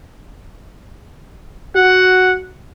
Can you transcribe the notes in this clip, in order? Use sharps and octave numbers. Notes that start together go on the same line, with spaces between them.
F#4 F#5